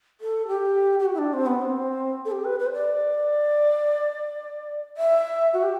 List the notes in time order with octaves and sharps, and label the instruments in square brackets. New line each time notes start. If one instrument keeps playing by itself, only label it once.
[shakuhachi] A4
G4
G4
F#4
E4
D4
C4
B3
C4
A4
G4
B4
B4
C5
D5
E5
F#4
G4